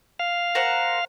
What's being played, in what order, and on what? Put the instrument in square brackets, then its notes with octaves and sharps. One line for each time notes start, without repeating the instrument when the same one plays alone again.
[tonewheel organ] F5
[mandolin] A#4 C5 F#5